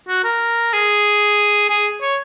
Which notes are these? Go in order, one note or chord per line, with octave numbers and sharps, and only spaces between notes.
F#4
A#4
G#4
G#4
C#5